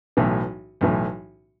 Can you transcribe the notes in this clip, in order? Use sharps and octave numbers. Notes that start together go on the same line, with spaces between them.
B1 A2 E3
B1 A2 E3